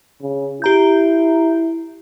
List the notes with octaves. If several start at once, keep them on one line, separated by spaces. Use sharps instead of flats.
C#3
E4 G4 A#5 G6